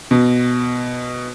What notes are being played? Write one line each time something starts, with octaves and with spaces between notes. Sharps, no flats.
B2